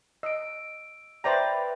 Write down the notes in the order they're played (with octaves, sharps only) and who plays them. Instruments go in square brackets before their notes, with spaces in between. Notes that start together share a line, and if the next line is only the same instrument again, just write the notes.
[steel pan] D#5 [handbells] E6 D7
[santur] B4 G5 [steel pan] C5 D5 A#5 [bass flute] E5